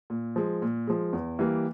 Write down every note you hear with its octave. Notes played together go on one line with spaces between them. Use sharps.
A#2
F3 G#3
A#2
F3 G#3
E2
E3 G3 A#3